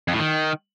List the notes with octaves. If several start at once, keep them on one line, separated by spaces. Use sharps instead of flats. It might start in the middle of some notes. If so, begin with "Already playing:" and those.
F2
A2
D#3